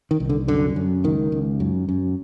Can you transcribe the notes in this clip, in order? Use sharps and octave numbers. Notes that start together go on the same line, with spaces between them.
D#3
C2
D3
F#2 D3
F#2
C#2 D#3
C#2
F#2
F#2